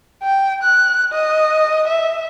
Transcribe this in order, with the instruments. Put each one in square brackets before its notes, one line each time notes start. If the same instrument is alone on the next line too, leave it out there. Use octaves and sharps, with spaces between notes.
[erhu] G5
F#6
D#5
E5